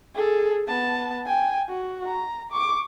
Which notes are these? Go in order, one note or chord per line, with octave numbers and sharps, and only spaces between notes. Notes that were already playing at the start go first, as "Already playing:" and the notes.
G#4 A4
B3 A5
G5 G#5
F#4
A#5
C#6 D6